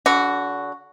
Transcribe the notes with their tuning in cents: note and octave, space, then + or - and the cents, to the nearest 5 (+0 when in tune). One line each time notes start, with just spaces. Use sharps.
D3 -40 F#4 +0